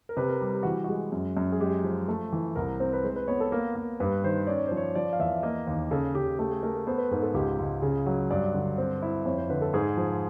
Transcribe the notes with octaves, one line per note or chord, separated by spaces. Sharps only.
A#4
C3 B4
A#4
G3
G4
E3 F#4
G#3 F#4
F#2
F#2
G#4
G#3 G4
F3
A3
E3
C2 A#4
C4
B4
G#3 C5
B4
B3 C#5
A4
A#3 A#4
A#3
G2 B4
D#3 C5
C#4 D5
C#5
F3 C5
C#5
F3 D5
F5
E2 E5
A#3 D#5
D#2
C#3 A4
C#3 G4
A3 G4
G#4
A3 A#4
A#4
B3 C5
B4
G#2 A#4
A4
C#2 G4
C#2
C#3 G#4
F#3
G2 D5
D3
C4
E4
F2 C#5
C5
D3 B4
A4
G#2 G#4
F3